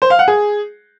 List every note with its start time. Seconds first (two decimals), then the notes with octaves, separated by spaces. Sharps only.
0.02 C5
0.10 F5
0.19 F#5
0.28 G#4